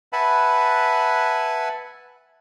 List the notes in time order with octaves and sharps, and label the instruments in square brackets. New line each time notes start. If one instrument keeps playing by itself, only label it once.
[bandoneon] B4 E5 F#5 G#5 A5 B5